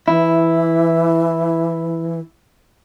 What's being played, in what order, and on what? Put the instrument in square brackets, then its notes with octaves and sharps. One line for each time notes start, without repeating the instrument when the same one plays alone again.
[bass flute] E3 [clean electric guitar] E4